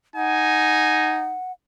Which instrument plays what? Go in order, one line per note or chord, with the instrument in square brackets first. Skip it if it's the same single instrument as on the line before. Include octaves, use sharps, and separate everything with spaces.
[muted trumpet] D#4 [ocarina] F#5 [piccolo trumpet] G#5